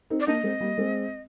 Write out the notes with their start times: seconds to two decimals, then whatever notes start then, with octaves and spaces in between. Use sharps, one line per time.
0.10 C4 D#4
0.20 D5
0.27 A#3 D4 D#5
0.43 G#3 C4
0.61 G3 A#3
0.78 G#3 C4